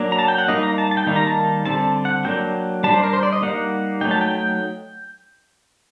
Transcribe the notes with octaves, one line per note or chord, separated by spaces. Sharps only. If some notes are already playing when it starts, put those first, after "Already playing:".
Already playing: F#3 A#3 D4
A#5
A5
G5
F#5
G3 A#3 D#4 D#5
A#5
A5
A5
G5
D#3 G3 A#3 D#4
A#5
A5
D3 G3 C4 A5
F#5
F#3 A#3 D4 G5
G3 D4 A5
C5
A#4
C5
D5
D#5
G3 A#3 D#4 F#5
F#3 A3 D#4 G5
A5
G5
G5